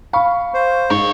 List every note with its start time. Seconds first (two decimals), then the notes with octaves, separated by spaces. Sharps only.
0.13 F5 B5 C#6
0.54 C5
0.90 G#2 A#4 C#5